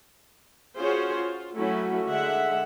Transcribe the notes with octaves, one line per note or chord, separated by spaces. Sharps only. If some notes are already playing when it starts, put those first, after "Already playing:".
C#4 F4 F#4 G#4 C5 C#5
F4
F#3 A3 C#4 E4 F#4
D3 G#3 E5 F#5